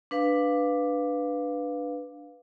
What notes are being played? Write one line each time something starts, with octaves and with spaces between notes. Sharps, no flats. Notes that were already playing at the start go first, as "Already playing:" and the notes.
D4 B4 F5